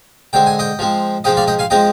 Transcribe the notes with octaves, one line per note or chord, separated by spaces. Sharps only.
D3 G#3 C4 G5
G#5
D#5 G5
F3 G#3 C4
F3 G#3 C4 D#5 G5
D5 F5
D#5 G5
F5 G#5
F3 G#3 C4 D#5 G5